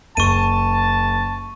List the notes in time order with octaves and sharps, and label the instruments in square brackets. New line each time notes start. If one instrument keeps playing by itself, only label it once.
[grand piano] F#1 [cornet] A5 [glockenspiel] C#6 D#7